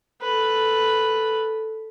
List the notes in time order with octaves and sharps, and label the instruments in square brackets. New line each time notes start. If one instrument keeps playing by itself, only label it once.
[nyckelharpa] A4 B4